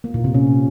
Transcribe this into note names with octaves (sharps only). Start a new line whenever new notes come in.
A#3
A#2
C3
C#4